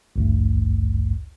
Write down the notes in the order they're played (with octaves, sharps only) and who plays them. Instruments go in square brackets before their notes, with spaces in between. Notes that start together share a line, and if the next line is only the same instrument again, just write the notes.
[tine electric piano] A1 D2 G2